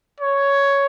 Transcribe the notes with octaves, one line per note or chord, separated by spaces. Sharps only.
C#5